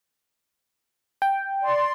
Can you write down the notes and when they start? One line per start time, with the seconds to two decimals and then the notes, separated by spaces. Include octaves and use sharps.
1.22 G5
1.64 D5 C6